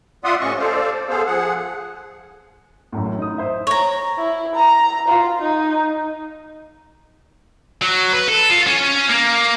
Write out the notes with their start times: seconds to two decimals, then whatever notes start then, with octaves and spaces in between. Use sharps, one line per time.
0.24 F4 D5 E5 F#5 C6 D#6
0.41 A2 C3 C#4 D#5 C#6
0.59 A4 C5 D5 F5
1.09 B3 G#4 A4 C5 F5
1.26 F3 G#4 F#5
2.93 A1 F#2 A2
3.19 D#4 D#6
3.38 C5 E5
3.67 C#5 A#5
4.18 E4
4.55 A#5
5.08 F4
5.42 D#4
7.81 F#3
8.13 B4
8.28 A4
8.50 F4
8.67 C#4
9.10 A#3